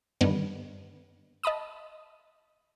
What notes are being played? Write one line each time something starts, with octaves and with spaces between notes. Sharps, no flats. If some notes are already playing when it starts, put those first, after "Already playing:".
G2 D3 D#3 B3
D#5 A5 B5 D#6